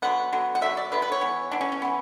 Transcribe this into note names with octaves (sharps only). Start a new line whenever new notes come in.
D3 F#3 B3 F#5
D3 F#3 B3
F#5
D3 F#3 B3 E5
D5
D3 F#3 B3 B4
B4
C#5
E3 B3
E3 B3 D4
C#4
C#4
E3 B3